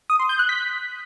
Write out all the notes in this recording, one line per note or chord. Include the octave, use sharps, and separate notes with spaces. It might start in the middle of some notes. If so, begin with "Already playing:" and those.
D#6
C6
G6
F#6
B6